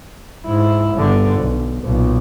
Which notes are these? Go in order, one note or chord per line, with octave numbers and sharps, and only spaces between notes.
G#2 E4
G1 D3
B1
B1 A#2